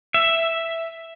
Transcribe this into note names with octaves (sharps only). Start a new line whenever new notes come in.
E5